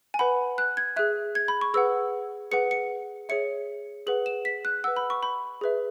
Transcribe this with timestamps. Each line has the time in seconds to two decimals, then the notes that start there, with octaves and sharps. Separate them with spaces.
0.14 G#5
0.19 B4 F#5 B5
0.58 F#6
0.77 G#6
0.96 G#4 E5 F#6
1.35 G#6
1.48 B5
1.61 C#6
1.74 G#4 B4 F#5 E6
2.51 G#4 B4 F#5 C#7
2.71 C#7
3.29 G#4 C#5 E5 C#7
4.07 G#4 B4 F#5 F#7
4.26 E7
4.45 B6
4.65 F#6
4.84 B4 F#5 E6
4.96 B5
5.10 C#6
5.23 B5
5.61 G#4 B4 E5